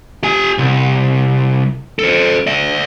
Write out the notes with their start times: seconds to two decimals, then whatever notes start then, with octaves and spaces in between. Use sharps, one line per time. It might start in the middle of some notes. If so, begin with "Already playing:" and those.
0.23 G4 G#5
0.58 C2
1.99 A4 C5
2.47 D5 E5